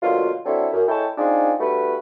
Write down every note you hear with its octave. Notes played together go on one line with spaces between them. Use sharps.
B2 D3 F#3 A#3 F4
F#3 C4 D4 E4 A4
F#2
G#3 E4 A4 C#5 G5 A5
C4 D4 D#4 F4 G#4
G2 A3 F#4 B4